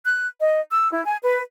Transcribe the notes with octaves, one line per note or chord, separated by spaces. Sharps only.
F#6
D#5
E6
E4
G#5
B4